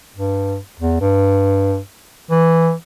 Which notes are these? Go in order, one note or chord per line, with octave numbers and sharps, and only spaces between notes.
G2
E2
G2
E3